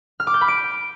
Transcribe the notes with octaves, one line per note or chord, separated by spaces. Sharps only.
F6
D6
G6
B5
D7